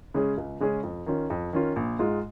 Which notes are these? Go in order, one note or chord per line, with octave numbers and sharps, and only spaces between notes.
C#3 G#3 C#4 G#4
C#2
C#3 G#3 C#4 G#4
F2
D#3 C#4 F4
F2
D#3 C#4 F4
A#1
G#2 G#3 F4